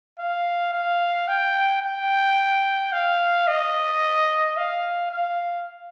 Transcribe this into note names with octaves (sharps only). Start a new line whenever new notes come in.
F5
F5
G5
G5
F5
D#5
F5
F5